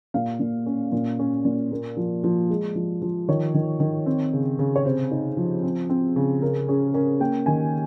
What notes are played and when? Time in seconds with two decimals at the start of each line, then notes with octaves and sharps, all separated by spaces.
0.14 A#2 F5
0.40 A#2
0.66 C#4
0.92 A#2
1.19 C#4
1.45 A#2
1.72 A#3
1.97 F3
2.24 F3
2.50 G#3
2.75 F3
3.02 F3
3.28 D#3 C#5
3.54 D#3
3.80 D#3
4.06 C4
4.33 C#3
4.59 C#3
4.76 C#5
4.85 C3 C5
5.11 D#4
5.37 F3
5.63 C4
5.90 C4
6.16 C#3
6.42 C#3 A#4
6.68 C#4 G#4
6.94 C#4 A#4
7.20 A#3 G5
7.46 D#3 G#5